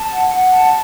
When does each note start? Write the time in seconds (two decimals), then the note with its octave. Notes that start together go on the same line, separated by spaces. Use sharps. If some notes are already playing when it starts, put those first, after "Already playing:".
Already playing: A5
0.10 F#5
0.30 F#5
0.50 A5